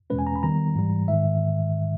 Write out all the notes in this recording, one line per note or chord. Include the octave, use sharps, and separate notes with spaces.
E2 B2 G#3 C#4 B4
G#5
A#5
B5
D#3 G3 B3 A#5
G#2 E3 G3
G#2 D#3 G#3 E5